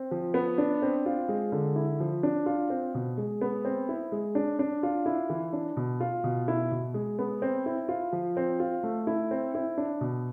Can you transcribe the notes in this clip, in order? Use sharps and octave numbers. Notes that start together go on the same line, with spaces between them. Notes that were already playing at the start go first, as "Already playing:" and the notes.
Already playing: C4
F3
B3
D4
C4
F4
G#3
D3
E4
F3
D4
F4
C4
B2
G#3
B3
C4
E4
G#3
D4
D4
F4
E4
E3
D4
B2
F4
B2
E4
B2
G#3
B3
C4
E4
F4
F3
C4
F4
A3
E4
C4
E4
D4
B2